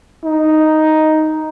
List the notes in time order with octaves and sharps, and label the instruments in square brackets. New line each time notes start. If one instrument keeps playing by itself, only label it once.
[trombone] D#4